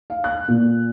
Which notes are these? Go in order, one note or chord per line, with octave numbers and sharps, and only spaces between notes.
F5
F#6
A#2